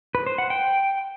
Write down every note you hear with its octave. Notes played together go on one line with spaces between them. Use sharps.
B4
C5
F#5
G5